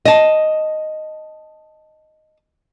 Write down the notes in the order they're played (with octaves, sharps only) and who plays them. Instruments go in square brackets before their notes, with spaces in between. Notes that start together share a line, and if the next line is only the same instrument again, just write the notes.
[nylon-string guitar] D#5 A5